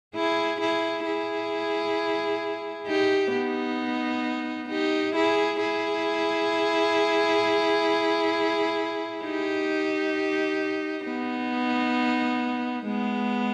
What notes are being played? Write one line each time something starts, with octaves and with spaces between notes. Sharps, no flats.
E4 G#4
E4 G#4
E4 G#4
D#4 G4
B3 D#4
D#4 G4
E4 G#4
E4 G#4
D#4 G4
B3 D#4
G#3 B3